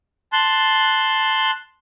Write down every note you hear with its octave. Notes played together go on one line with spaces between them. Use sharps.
A5 C6 F#6